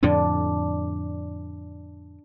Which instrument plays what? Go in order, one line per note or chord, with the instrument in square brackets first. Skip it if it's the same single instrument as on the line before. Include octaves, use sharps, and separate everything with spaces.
[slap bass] F2 A2 D3 [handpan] D4